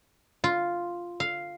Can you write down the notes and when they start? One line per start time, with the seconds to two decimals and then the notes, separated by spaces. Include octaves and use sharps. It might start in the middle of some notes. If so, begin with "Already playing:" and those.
0.44 F4
1.20 F5